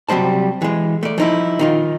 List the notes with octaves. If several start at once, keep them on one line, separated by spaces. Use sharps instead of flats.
C3 F#3 G3 C5 A5
E3 G#3
A3 D5
F3 D#4 E4
D#3 D#4 F4